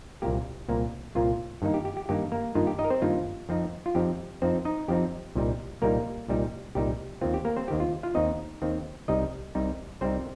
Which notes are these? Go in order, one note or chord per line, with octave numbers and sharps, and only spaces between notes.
C2 A#2 A#3 G4
C2 A#2 A#3
C2 A#2 A#3 F4
G2 D#3 A#3 D#4
G4
G4
G4
G2 D#3 A#3 D#4 G4
A#3 A#4
G2 D#3 A#3 D#4 F4
G4
D#4 D#5
A#4
C4 C5
G2 D#3 A#3 D#4 F4
F2 F3 C4 D#4
F4
F2 F3 C4 D#4 G4
F2 F3 C4 D#4 C5
D#4 D#5
F2 F3 C4 D#4 G4
C2 A#2 G3 D#4
C2 A#2 G3 A#3 D#4 A#4
C2 A#2 G3 D#4
C2 A#2 G3 D#4 G4
D#2 D#3 C4 F4
G4
A#3 A#4
C4 C5
D#2 D#3 C4 G4
F4
F4 F5
D#2 D#3 C4 D#4 D#5
D#2 D#3 C4
C2 C3 G3 D#4 D#5
C2 C3 G3 D#4
C2 C3 G3 C4 D#4 C5